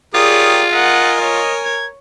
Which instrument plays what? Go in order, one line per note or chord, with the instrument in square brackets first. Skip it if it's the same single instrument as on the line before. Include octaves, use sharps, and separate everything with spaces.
[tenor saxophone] F4 [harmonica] G4 A#4 D#6 [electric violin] G#4 D5 [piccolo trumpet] C#5
[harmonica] A#4 G#5 [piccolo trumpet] D#5 [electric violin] F#5
[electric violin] C#5 [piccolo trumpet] D#5
[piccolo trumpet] G#6